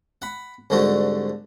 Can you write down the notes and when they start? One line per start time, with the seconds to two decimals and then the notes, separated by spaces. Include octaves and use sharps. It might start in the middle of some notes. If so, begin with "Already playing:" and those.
0.22 F#5 B5
0.70 C2 G#2 D3 A3 F#4